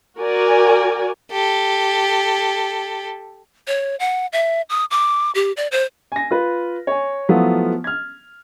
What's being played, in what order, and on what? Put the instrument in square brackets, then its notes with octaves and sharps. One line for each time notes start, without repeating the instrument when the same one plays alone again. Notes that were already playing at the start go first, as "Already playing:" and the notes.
[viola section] F#4 A#4 D5 G#5
[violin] G4 A4
[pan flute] C#5
F#5
E5
D#6
D6
G4
D5
C5
[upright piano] G#5 A#6
F4 B4
C#5 G#5
F3 F#3 A3 B3 E4 F4
F6 G#6